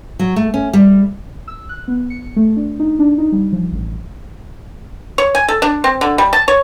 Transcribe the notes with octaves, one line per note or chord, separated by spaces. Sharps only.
F#3
A3
C#4
G3
E6
F#6
B3
C#7
A3
D4
D#4
D4
D#4
G3
F3
A1
C#5
G#5
A4
D4
C4
D3
G3
A5
C#5